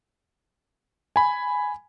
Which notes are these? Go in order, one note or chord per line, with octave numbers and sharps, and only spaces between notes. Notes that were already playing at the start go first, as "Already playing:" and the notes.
G#5 B5